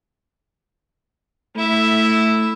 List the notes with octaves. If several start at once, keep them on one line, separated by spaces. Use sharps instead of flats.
A3 E4 E5